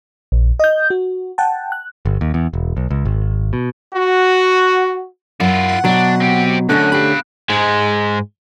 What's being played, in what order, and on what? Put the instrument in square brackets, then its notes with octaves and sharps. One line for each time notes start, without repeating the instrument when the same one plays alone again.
[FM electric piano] A#1
D#5 G6
F#4
F#5 G5 A5
F#6
[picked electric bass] G1
D#2
E2
E1
B1
C#2
G#1
B2
[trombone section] F#4
[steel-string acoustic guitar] F#2 [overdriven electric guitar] E4 F4 [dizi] F#5
[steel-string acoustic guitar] B2 [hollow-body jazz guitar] F#3 [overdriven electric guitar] D4
[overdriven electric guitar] C4 G4
[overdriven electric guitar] F#2 [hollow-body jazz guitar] D3 A3 C#4 [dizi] F#6
[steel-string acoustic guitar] G4 [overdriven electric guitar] F5 B5
[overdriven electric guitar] G#2 G#3